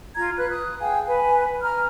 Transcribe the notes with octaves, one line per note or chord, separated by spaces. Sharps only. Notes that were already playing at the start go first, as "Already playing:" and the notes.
F4 A#5 G#6
B4 F#6
D#6 F#6
G#4 F5 G5 G#5
B4 G#5
A#5 F6